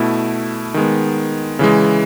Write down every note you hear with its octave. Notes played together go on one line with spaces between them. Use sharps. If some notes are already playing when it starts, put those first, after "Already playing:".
Already playing: B2 A3 E4
D#3 G#3 B3
C#3 E3 G#3